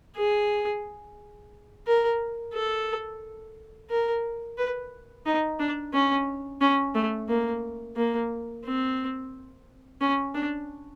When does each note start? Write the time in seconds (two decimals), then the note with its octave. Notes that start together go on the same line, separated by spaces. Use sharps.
0.16 G#4
1.87 A#4
2.53 A4
3.90 A#4
4.58 B4
5.26 D#4
5.59 D4
5.93 C#4
6.61 C#4
6.95 A3
7.29 A#3
7.96 A#3
8.65 C4
10.00 C#4
10.34 D4